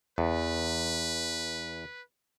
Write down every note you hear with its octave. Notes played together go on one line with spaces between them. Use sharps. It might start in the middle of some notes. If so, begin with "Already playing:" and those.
E2 B4